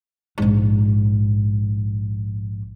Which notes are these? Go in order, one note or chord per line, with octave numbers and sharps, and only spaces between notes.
A#1 G#2